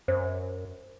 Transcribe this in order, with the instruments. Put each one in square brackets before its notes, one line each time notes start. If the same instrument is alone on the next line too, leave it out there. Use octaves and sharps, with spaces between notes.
[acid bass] F#2 [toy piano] C5